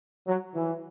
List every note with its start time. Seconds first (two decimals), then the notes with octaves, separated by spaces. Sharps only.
0.27 F#3
0.55 E3